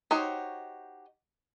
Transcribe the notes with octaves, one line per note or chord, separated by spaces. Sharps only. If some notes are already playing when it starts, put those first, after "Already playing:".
D#4 F#4 G4 C5 C#5